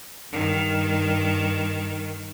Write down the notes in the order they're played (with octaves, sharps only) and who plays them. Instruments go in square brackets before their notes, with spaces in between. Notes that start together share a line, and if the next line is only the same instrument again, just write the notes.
[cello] G2 D#3